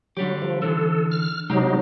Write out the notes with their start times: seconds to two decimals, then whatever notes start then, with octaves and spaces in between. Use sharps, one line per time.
0.17 D3 F#3 G3 G4
0.42 F3
0.62 D3 E3 A4
1.12 F6
1.50 C3 F#3 G#3 D#4 G4